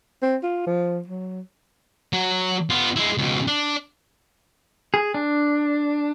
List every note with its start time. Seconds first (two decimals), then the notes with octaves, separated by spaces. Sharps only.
0.22 C4
0.43 F4
0.67 F3
1.07 F#3
2.13 F#3
2.70 B3 F4
2.96 G#3 E4
3.17 C#2 B2
3.47 D4
4.94 G#4
5.14 D4